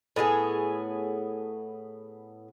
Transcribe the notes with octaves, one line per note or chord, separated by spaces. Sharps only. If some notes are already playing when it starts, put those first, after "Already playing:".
A2 B3 F4 G#4